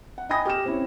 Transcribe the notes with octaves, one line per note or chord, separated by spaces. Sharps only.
F#5
D#5 G5 G#5 B5 D#6 A#6
G4 F6 E7
C4 C#4 E4 C#5